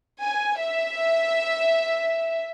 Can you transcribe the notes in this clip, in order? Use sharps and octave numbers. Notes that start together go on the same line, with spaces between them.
G#5
E5